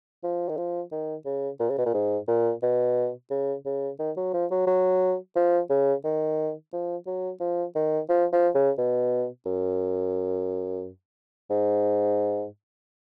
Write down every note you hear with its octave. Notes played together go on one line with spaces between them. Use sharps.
F3
D#3
F3
D#3
C#3
A#2
C#3
B2
A#2
G#2
A#2
B2
C#3
C#3
D#3
F#3
F3
F#3
F#3
F3
C#3
D#3
F3
F#3
F3
D#3
F3
F3
C#3
B2
F#2
G#2